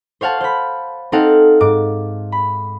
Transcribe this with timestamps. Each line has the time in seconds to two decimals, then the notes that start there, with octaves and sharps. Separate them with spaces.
0.21 C5 C#5 F5 F#5 A5
0.40 C5 B5
1.12 C4 D#4 A4 F5 F#5
1.61 G#2 D6
2.32 B5